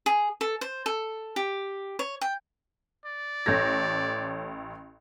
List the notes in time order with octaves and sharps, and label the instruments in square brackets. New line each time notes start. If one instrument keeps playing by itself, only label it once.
[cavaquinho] G#4
A4
C5
A4
G4
C#5
G5
[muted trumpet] D5
[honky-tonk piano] A1 A4 A#6 [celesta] C#5 G6 G#6